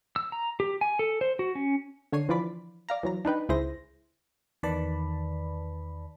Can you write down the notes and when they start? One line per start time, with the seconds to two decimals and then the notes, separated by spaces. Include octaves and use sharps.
0.16 E6
0.32 A#5
0.60 G4
0.81 G#5
0.99 A4
1.21 C5
1.39 F#4
1.55 C#4
2.12 D3 D4 C#5 C7 D#7
2.29 E3 F3 F4 D5 B5
2.89 D5 F5 A#5
3.03 E3 F#3 A#5
3.25 D4 D#4 B4 G5
3.49 C#2 E4 G#4 C5 A#6
4.63 E2 D#3 B4 D5 A5 B5